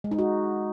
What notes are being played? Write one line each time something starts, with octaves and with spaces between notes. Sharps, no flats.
G#3
D#4
F#4